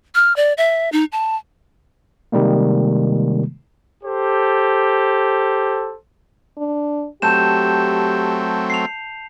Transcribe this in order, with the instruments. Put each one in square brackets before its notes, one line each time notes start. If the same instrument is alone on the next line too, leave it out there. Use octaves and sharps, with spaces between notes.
[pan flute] F6
D5
E5
D#4
A5
[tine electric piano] C3 D#3 G3 G#3 A#3
[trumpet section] G4 A4 C5
[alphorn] D4
[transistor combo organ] F#3 A3 C4 [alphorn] G4 [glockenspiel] A5 G6 E7
[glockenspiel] C7 F7